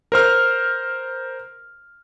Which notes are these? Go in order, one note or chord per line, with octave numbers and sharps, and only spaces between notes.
A#4 C5 F6